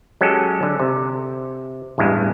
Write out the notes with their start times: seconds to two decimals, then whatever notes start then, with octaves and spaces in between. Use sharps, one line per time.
0.21 F#3 G#3 C#4 G4 A4
0.63 D3
0.80 C3
1.98 A1 E2 G2 G#3